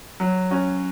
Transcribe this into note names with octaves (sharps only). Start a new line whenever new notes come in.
F#3
C#4 F#4